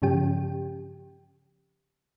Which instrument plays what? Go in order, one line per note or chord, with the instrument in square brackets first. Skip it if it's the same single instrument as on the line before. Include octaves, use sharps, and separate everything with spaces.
[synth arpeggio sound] G2 C#3 F3 C#4 G4 G5